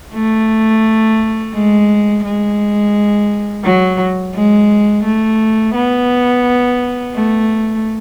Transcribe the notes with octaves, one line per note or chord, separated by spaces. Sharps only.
A3
G#3
G#3
F#3
G#3
A3
B3
A3